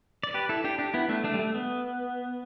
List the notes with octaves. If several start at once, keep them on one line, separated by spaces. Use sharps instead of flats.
D5
G4 B4
E4 A4
D4 G4
D4 G4
B3 E4
A3 D4
A3 D4
G3
A3
B3